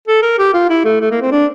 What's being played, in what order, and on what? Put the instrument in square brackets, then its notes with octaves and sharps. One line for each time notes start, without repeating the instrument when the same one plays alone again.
[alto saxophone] A4
A#4
G4
F4
E4
A3
A3
A#3
C4
D4